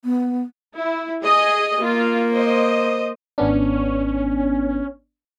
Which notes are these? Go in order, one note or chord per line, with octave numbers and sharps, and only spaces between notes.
B3
E4
G#4 D#5
A#3 F4
C5 D#5
G#1 B3 C#4 D4